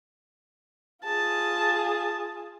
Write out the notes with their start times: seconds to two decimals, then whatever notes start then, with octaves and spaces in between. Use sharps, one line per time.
1.05 F4 G#4 A5